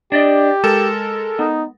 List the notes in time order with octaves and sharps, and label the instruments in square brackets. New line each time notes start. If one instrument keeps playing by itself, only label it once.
[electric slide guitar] D4 D5 D#5 [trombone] G4
[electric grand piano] G#3 A4 A#4 [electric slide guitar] A5
[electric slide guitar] B3 [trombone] D#4